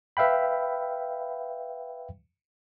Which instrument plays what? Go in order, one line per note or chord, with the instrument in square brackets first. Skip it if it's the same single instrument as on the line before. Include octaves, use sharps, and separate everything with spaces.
[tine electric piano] B4 E5 F5 G5 B5